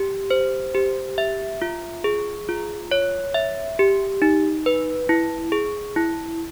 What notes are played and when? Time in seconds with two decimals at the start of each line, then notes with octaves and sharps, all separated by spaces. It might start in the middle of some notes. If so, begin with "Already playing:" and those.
Already playing: G4
0.31 C5
0.74 G4
1.18 E5
1.62 F4
2.04 G#4
2.49 F4
2.91 C#5
3.34 E5
3.79 G4
4.22 D#4
4.66 B4
5.09 E4
5.52 G#4
5.96 E4